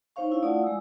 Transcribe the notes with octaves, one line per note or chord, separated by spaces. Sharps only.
D#4 C5 C#5 F5 C#6
D4 E4 F5
A3 F4 D5 F#5 D#6
G#3 E6